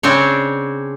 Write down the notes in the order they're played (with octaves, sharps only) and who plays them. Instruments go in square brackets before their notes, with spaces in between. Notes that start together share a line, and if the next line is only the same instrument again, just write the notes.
[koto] C#3 C4 D4 C5 C#5